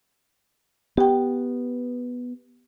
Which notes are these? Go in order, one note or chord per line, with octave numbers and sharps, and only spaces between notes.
B3 G4 G5